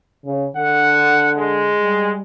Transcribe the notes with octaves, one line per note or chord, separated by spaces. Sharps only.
C#3
D3 F#5
G#3
G3